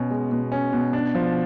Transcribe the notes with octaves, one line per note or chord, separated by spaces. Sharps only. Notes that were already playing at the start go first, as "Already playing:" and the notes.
Already playing: B2 C#4
G#3
B2
C#4
B2
D4
F3